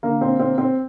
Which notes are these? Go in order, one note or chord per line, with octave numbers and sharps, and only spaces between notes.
D3 A#3
C4
C4
C4